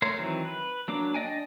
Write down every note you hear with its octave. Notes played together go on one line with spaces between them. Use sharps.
A3 A#4 C#5 C6
D#3 E3 F#3 C4
B4
F#3 A#3 D4 D6
D4 D5 D#5 G5 G#5